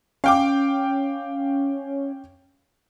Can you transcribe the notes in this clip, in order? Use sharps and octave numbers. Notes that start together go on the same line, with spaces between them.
C#4 F5 G5 D6